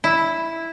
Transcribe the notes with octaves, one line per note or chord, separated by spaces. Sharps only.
E4